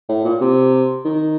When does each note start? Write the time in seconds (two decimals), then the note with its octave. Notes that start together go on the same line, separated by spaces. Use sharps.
0.09 A2
0.24 A#2
0.41 C3
1.05 D#3